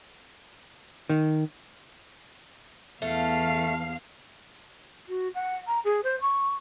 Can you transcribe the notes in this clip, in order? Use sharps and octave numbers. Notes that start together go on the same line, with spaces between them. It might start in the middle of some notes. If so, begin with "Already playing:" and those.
D#3
E2 A3 F5
F#4
F#5
A#5
G#4
C5
C#6